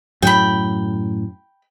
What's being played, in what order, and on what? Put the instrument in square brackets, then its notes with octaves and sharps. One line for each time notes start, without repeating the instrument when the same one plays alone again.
[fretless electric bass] F#2 A2 F#3 [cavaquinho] G5 B5